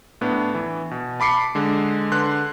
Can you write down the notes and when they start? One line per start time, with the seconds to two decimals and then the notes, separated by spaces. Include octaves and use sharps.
0.21 A2 B3 D4
0.54 E3
0.91 B2
1.20 A5 B5 D6 C7 C#7
1.55 D3 G#3
2.11 D3 B4 C6 F#6